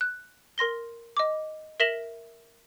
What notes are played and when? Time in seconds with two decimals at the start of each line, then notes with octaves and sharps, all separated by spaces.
0.01 F#6
0.58 A#4 C6 A#6 G7
1.17 D#5 D6
1.80 A#4 E5 A#6 B6 E7 F#7